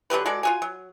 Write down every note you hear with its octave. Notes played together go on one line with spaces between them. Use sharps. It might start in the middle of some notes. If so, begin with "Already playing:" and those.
D3 F#3 G4 B4
G#3 F#4 A4 D5
F4 F#4 G#5
F#3